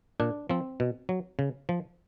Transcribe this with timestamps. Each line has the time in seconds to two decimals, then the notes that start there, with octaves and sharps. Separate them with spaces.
0.20 A#2 D4
0.49 F3 C4
0.80 B2
1.09 F#3
1.39 C#3
1.69 F3